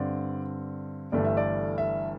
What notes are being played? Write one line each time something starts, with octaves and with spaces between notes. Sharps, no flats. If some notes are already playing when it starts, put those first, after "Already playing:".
Already playing: G2 D3 C4 D5
G1 G2 E3 A3 D4 D5
E5
D5
E5